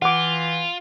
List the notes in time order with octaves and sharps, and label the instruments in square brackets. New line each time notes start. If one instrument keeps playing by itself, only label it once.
[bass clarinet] E3 [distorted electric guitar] F4 [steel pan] F#5 D6